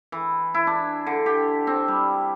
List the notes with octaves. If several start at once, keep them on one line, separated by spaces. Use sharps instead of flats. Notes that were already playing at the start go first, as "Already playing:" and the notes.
E3
E4
D4
D3
G4
C4
G3